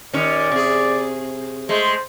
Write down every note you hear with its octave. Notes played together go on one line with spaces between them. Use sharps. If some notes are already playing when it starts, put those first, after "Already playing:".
D#2 C#4 D5
C3 G#4
G#3 A3 C5